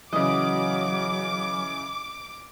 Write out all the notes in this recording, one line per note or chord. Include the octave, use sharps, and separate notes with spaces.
C#3 E3 F#3 D#5 D6